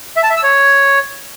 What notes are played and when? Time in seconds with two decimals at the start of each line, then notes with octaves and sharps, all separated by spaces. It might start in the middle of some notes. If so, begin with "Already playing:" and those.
0.17 E5
0.23 A5
0.30 E5
0.37 E6
0.43 C#5